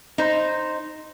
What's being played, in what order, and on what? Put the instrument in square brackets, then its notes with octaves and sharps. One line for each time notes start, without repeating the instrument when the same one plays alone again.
[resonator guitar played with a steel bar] D#4 C5